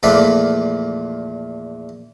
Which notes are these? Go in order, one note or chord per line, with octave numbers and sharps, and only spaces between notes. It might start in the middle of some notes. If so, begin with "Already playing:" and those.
E2 A#2 F3 A3 B4 D5